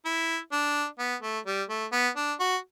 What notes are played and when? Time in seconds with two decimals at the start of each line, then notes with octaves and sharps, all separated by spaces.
0.05 E4
0.52 D4
0.99 B3
1.22 A3
1.46 G3
1.69 A3
1.92 B3
2.16 D4
2.40 F#4